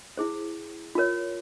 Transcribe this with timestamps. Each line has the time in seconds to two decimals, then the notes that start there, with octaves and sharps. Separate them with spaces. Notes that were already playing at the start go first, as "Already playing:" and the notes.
0.17 E4 G#4 C5
0.95 F4 A#4 C#5